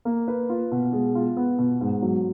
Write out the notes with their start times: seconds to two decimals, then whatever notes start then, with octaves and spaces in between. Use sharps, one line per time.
0.05 A#3
0.28 B4
0.49 F4
0.72 B2
0.93 G#3
1.15 F4
1.37 B3
1.58 B2
1.81 G#2
2.02 F#3